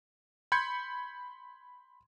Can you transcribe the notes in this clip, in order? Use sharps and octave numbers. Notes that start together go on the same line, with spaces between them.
B5 C6 G6 G#6 C#7